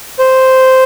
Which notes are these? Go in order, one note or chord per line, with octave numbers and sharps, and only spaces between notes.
C5